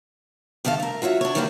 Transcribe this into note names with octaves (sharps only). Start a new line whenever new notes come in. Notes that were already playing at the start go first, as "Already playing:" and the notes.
G2 D#3 A4 E5 F5
A3 A#4
F4 F#4 C#5 E5
D4 C#5
D#3 E3 G3 A#3 C#4 E4